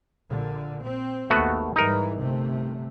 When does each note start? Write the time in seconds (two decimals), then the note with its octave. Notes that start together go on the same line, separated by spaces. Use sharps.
0.29 A#1 A#2 D3
0.84 C4
1.30 G#1 D#2 A3 B3 F#4
1.76 G#2 E3 G3 D#4 A#4
2.19 G1 C3 A3